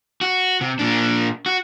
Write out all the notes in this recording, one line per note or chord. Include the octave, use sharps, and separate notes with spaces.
F#4
C3
A#2 D4
F#4